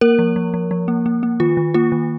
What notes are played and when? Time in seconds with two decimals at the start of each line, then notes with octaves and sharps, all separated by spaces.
0.01 A#3 A#4
0.19 F3
0.36 F3
0.54 F3
0.71 F3
0.88 A#3
1.06 A#3
1.23 A#3
1.40 D#3 F4
1.57 D#3
1.74 A#3 F4
1.92 D#3